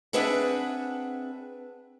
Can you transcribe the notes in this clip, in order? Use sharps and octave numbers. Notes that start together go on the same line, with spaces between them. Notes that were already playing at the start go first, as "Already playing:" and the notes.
C4 D4 G#4 B4 E5 F#5